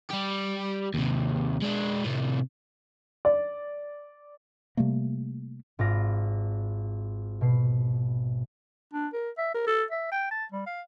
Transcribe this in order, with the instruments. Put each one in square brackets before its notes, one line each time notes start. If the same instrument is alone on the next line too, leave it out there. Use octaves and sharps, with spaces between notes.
[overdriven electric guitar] G3 G4
D#2 C3
G#3 D4
A2 C3
[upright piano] D5
[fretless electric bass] C3 G3 A3 A#3
[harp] G#1 F4 D5 A#6
B2 C7
[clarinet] D4
A#4
E5
A#4
A4
E5
G5
A5
G3
F5